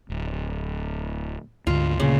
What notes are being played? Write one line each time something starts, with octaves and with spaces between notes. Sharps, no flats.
D1
D2 G#2 D3 F4
D2 A#2 C#3 A#3